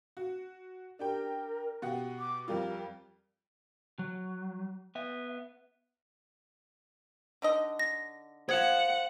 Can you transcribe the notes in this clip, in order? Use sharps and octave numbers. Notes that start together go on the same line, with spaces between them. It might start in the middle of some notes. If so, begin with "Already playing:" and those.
F#4
D4 G4 A#4 G5
B2 G4 F#5
D6
F2 G3 F4 A#4
F#3
B3 E5
D3 D#4 D#5
A#6
C5 F5 F#5 G#6